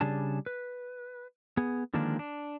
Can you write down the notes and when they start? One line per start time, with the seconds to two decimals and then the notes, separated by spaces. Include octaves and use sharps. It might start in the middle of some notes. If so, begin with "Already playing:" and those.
0.01 C#3 G3 D4 G#4 A5
0.46 B4
1.57 B3 G#4
1.94 D3 D#3 F3 G#3 A#3 D4
2.19 D4